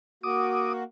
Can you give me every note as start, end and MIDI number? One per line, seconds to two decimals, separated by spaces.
0.23 0.83 58
0.23 0.83 66
0.23 0.73 86
0.23 0.73 87